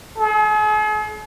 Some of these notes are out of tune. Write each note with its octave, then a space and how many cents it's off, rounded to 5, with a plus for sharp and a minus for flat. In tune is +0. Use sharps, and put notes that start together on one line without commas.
G#4 +45